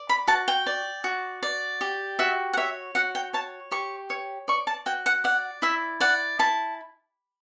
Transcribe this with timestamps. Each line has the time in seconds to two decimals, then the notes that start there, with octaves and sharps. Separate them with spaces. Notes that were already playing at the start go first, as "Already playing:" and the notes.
Already playing: D5
0.09 B5
0.28 F#4 A5
0.48 G5
0.66 D5
1.04 F#4
1.43 D5
1.81 G4
2.19 F#4 E5
2.53 F#5
2.57 C#5 E5
2.95 F#4 F#5
3.15 G5
3.33 C#5 A5
3.71 G4 C#6
4.10 C#5
4.48 D5 C#6
4.67 A5
4.86 F#4 G5
5.06 F#5
5.24 D5 F#5
5.62 E4 E5
6.00 D5 F#5
6.39 E4 A5